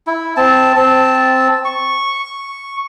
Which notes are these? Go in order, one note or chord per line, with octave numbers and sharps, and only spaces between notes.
E4
C4 A5
C4 A5
C#6